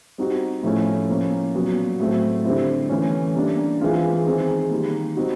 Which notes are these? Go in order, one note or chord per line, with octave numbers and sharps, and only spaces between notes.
G3 C4 D#4 F#4
A2 F3 A3 C#4 E4
F3 A#3 C#4
A#2 F#3 B3
A2 F#3 A3 C4
D3 G3 C4 E4
E3 A3 C#4
G3 A#3 D4
E3 G#3 C4 F4
D#3 G#3 C4
D#3 G3 A#3
D#3 G3 C4 D#4 F#4